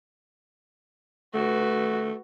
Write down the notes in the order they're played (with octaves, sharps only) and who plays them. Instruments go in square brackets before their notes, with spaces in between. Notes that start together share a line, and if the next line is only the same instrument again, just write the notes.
[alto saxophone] A3 [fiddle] F#4 B4